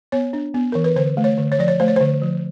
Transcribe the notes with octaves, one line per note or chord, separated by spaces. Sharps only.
B3 C#5
D4
B3
E3 A#4
B4
D3 C5
A3
C#5
D3
C#5
F3 D5
C#5
A3 C5
C#5
D3 C5
F3